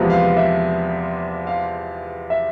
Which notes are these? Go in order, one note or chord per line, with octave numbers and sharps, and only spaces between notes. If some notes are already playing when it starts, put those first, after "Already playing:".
Already playing: E2 C3 F3 G#3 B3
F5
E5
F5
E5